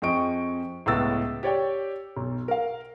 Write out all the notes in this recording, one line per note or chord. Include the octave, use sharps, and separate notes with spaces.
F2 F3 G#4 D#5 C#6 D7
C#2 A2 B3 E6 A6
G4 C#5 D5 G5
B1
A#4 F5